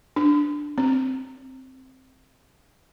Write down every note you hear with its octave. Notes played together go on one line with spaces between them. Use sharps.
D4
C4